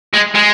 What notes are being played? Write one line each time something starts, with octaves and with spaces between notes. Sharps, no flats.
G#3
G#3